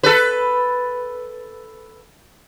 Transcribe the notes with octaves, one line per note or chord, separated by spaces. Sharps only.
A4 B4